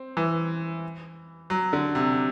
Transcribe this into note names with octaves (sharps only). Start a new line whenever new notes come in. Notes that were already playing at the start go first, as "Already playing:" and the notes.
Already playing: C4
E3
F#3
D3
C3